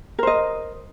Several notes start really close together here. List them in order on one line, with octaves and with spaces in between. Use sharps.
A#4 C5 D#5